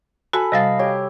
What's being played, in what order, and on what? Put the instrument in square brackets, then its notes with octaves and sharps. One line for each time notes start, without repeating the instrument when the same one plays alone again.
[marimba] F#4 [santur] A4 G#5 B5
[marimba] C3 G3 A6 [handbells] D#5 F5
[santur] G4 [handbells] C#5